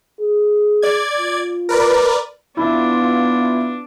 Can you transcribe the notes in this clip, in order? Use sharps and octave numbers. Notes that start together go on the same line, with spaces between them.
G#4
D5 G#6
F4
A#4 B4 D5
B3 D4 E4 F4 E5